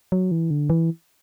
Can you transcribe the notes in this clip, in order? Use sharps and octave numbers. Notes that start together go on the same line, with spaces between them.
F#3
E3
D3
E3